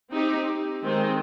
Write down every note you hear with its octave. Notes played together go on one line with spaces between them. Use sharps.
C4 D#4 G4
D#3 G#3 C4 D#4